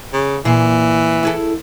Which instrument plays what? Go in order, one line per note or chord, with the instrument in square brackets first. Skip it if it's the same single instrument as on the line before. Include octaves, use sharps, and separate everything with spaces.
[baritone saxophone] C#3
[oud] A#2 G#4 [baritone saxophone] E3
[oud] E4 G#4 A4